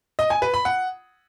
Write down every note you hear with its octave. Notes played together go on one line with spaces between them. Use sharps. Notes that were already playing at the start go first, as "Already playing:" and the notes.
D#5
G#5
B4
B5
F#5